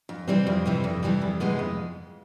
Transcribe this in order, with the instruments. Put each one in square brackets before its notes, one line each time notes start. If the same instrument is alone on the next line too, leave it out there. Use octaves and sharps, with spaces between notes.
[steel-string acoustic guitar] F2
C3 E3 G3 C4
F2
C3 E3 G3 C4
F2
C3 E3 G3 C4
F2
C3 E3 G#3 B3
F2